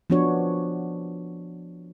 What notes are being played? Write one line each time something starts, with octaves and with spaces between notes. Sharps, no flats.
F3 B3 D4 F#4 C#5